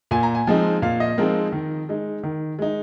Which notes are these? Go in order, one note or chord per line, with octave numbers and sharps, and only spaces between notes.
A#2 G#5
A#5
G#5
F3 G#3 C4 D#4
A#2 F5
D#5
F3 G#3 C4 D#4 A#4
D#3
G#3 D#4
D#3
G#3 D#4